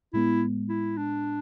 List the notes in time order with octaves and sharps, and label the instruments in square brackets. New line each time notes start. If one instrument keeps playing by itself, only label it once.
[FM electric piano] A2 G#3 B3 [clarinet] E4
[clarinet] E4
D4